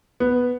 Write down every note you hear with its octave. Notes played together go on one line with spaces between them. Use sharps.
B3